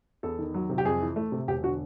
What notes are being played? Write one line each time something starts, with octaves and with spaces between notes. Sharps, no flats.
E2 A4
D#3
F#3
C3
G4
F2 G#4
E3
A3
C3
E1 G4
D3 F#4